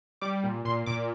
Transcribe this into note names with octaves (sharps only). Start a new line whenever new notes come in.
G3 D6
A#2
A#2 C6
A#2 D6